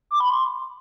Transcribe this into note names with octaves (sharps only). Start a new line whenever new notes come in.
D6
B5
C6